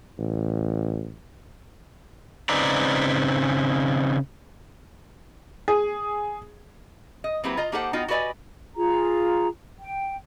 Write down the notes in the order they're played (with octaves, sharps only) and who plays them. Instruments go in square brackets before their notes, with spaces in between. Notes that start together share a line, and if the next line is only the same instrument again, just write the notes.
[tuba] A1
[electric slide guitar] C#3 C4 D#4 B4 D5 A#5
[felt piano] G#4
[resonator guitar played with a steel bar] D#5
F#3 A#3 C4 E4 G4 B4
F4 D#5 A#5
A#3 D#4 G4 A4 C5 F#5
B3 D#4 F4 F#4 D#5 G5
F#4 G4 B4 D5 D#5 G#5
[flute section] F4 G#4 A#5
G5